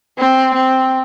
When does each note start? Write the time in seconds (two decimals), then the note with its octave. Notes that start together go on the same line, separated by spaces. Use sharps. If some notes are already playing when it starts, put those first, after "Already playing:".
0.19 C4
0.54 C4